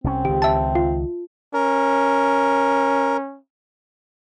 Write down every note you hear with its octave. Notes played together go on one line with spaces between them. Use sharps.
C2 C4 C#4
C#2 D#3 G4
E5 A5
F4
C#4 A#4